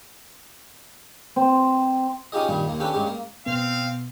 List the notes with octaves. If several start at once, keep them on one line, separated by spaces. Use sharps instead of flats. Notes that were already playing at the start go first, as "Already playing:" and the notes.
C4
C#4 D#4 F4 G4 G#4 D#5
G2 A#2 D#3 G3
D#2 A#3
C#4 D4 G4 A4 B4
G2 G#3 C#4 G4
A#3
B2 B3 C4 F5